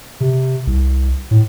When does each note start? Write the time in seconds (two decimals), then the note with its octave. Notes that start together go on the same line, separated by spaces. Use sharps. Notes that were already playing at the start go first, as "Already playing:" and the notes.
0.20 C3
0.67 C2
1.31 A2